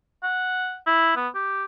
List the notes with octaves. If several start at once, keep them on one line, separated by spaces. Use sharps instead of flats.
F#5
E4
B3
G4